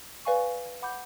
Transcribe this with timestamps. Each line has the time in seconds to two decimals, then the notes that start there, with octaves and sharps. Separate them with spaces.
0.25 B4 D5 F5 G#5 C#6
0.82 F#5 B5 D6 G6